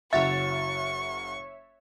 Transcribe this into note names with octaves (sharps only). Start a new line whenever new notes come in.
F#1 F#4 C#5 E5 C#6 A6